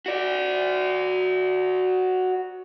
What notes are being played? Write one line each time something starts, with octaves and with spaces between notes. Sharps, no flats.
F#4 D5